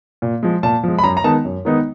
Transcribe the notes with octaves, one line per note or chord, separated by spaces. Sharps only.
A#2
F3 G#3
A#2 A5
F3 G#3
B5
F#2 A#5
A#5
D#3 G#3 B3 D#4 A5
F#2
D#3 G#3 B3 D#4